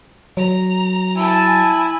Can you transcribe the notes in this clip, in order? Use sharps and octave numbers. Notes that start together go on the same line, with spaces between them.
F#3 A#5
E4 G#5 A5